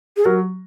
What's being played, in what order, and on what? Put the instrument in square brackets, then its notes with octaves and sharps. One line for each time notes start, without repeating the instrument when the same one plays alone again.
[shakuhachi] G#4
[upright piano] F#3 [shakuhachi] A#4